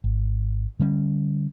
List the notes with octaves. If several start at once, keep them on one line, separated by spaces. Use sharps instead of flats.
G#1
D3 G3 C#4